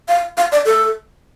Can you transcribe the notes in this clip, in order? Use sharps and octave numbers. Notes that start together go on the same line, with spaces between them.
F5
F5
D5
A4